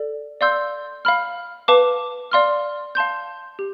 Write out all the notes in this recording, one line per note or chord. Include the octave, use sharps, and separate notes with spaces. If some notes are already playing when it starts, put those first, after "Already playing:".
Already playing: A4 D5
D5 F5 C6 E6 G6
F5 B5 F6
B4 F5 A5 D6
D5 F5 C6 F6
F5 A5 C6 G6
G4